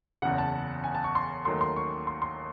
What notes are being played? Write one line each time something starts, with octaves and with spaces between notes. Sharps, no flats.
F#1 E2 C#3 F#5
A5
G#5
A5
C#6
C6
D#2 D#3 F#3 A3 C6
C6
C#6
C6
C6